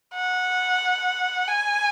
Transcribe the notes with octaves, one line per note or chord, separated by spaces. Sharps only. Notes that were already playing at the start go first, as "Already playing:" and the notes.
F#5
G#5